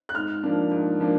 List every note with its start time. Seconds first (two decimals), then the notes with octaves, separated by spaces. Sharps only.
0.09 F#6
0.15 G#2 F6
0.43 F3 A#3 D4
0.71 G#2
1.00 F3 A#3 D4